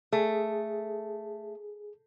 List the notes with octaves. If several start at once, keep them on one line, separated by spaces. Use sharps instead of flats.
A3 G#4